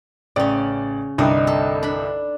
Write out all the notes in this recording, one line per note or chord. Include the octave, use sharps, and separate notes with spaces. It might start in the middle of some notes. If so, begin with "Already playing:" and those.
A1 C#3 C#4 D5
C2 G2 D3 D#4 D5
A4
D4 B5